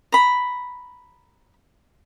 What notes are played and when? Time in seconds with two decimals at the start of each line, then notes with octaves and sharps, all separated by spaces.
0.12 A#5 B5